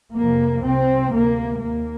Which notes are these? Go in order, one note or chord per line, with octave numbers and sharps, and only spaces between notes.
F2 C3 A#3
C2 C3 C4
D2 C3 A#3
D#2 A#3